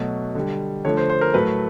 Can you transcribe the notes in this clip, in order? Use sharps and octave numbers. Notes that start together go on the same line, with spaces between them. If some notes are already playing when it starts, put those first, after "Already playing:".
Already playing: B2 F#3 A3
D3 G3
D3 F3 A3 C#5
C5
C5
A#4
A2 F#3 A3 B4